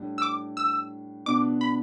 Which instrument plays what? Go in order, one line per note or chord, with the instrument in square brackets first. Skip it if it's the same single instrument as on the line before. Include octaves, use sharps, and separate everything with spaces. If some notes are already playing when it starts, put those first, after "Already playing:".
Already playing: [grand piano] A2 G3 D4
[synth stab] E6
D6
E6
[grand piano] B2 B3 D4 [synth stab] D6
[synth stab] B5